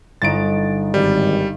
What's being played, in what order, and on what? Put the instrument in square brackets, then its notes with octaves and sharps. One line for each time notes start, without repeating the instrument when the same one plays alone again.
[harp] G1 D#4 [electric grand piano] A6 D7
[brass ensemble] G#1 [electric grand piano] G3